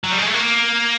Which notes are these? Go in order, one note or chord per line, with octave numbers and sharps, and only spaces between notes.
F#3
G3
G#3
A3
A#3